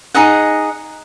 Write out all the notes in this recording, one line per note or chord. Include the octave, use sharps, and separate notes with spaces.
D#4 G#4 D#5 F#5